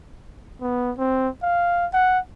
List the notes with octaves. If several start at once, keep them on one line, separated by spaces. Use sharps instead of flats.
B3
C4
F5
F#5